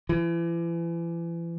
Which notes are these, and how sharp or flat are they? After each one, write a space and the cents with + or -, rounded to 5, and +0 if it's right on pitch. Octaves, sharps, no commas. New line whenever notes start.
E3 +35